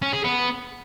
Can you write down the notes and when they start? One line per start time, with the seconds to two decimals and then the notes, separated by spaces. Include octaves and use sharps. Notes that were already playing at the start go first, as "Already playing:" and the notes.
0.02 C#4
0.13 G#4
0.24 B3